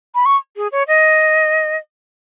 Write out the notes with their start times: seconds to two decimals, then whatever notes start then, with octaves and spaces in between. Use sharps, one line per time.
0.15 B5
0.26 C#6
0.56 G#4
0.72 C#5
0.88 D#5